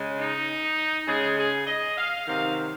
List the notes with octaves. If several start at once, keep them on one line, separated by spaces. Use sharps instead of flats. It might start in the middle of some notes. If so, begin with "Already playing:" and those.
Already playing: C#3 G#3
D#4
C#3 G#3 G#4
G#4
D#5
F5
C3 D#3 F#3 F5